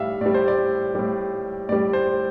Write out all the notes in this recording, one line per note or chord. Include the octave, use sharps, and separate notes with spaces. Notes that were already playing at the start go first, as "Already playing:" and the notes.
Already playing: A2 G3 E5 F5
A2 G3 D5
C5
D5
A2 G3
A2 G3 D5
C5